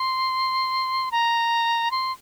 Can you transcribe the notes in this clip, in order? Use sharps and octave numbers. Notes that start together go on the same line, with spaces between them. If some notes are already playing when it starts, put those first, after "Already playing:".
Already playing: C6
A#5
C6